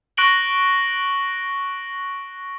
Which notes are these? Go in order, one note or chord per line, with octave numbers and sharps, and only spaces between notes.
C#6 F#6 A#6 D7 F#7 G7